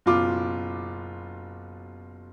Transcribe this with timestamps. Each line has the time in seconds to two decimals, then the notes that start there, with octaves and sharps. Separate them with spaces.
0.06 F#1 B2 F4 D6